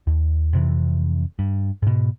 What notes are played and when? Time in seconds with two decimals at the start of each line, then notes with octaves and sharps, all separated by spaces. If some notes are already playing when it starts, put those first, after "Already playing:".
0.07 D#2
0.53 F2 C3 E3
1.39 G2
1.82 G#2 B2